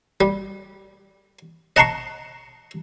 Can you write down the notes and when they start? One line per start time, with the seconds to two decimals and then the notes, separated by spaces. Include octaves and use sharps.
0.21 G3
1.76 D#5 F#5 A5 A#5 C6 C#6